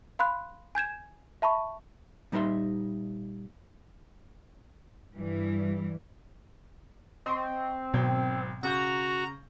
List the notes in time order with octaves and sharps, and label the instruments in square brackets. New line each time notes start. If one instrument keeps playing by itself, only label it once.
[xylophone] F5 B5 C6 F#6
G#5 G6 G#6 E7
E5 A5 B5 C#6
[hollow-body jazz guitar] A#2 G3 D#4 A#4 E5 C6
[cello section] G2 E3 G3
[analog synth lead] C4 [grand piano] D#5 C6 C#6
[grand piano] G#1 F#3 G5 [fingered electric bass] B2
[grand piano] C#3 C#6 G6 [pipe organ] F#4 [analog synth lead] A#5